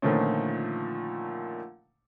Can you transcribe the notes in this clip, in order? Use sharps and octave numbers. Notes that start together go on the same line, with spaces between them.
A#2 D3 D#3 F3 A3 C#4